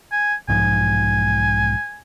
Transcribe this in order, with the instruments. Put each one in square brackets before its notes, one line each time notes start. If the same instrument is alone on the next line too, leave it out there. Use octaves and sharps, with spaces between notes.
[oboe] G#5
[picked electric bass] B1 G#2 F3 [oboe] G#5